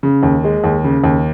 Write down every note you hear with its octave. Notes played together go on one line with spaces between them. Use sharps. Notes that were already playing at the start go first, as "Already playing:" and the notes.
C#3
D#2
G#3
D#2
C#3
D#2